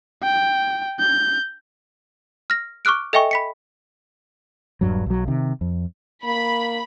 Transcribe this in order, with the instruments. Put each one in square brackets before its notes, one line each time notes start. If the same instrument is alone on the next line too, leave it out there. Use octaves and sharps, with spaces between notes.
[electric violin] G5
G6
[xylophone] F6 A#6
C#6 D6 F6 F#6 D7
A4 D#5 E5 G5 G#5 C#6
B5 B6 C#7
[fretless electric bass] D#1 G2 F#3
B1 F#3
C3 D#3
F2
[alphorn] A#3 [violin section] B5